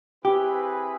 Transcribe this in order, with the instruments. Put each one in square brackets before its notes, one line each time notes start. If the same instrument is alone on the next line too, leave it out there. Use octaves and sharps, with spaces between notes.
[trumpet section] C4 E4 G#4 B4 [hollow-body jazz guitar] G4